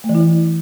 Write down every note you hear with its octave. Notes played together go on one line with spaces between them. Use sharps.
A3
E3
E4
E3